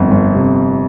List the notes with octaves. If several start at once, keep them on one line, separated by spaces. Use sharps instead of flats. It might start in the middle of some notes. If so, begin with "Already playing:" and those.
Already playing: G1 F2
G1
C3